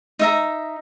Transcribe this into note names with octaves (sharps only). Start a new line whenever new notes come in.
D#4 E5 A#5